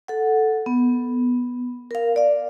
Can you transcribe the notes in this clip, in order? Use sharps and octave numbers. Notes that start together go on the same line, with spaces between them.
A4 F#5
B3
A#4 F5
D5 F5